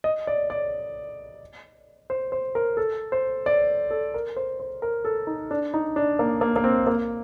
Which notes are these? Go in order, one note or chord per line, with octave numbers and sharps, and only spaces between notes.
D#5
D5
D5
C5
C5
A#4
A4
C5
D5
A4
A#4
C5
C5
A#4
A4
D#4
D4
D#4
D4
A#3
A#3
A#3
C4
A#3